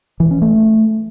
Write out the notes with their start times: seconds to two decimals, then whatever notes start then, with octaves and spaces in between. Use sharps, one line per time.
0.20 E3
0.31 C#4
0.42 A3